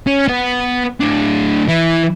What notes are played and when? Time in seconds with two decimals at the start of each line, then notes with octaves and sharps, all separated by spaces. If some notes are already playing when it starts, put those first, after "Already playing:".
0.07 C#4
0.28 B3 B4
1.01 A2 D4
1.68 E3 E4